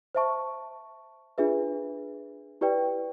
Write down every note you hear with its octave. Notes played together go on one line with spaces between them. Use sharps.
C5 E5 A5 C#6
D4 F4 G#4 B4 E5
E4 G4 B4 D5 G5